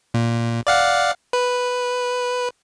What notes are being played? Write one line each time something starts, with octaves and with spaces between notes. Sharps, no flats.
A#2
D5 F5 F#5
B4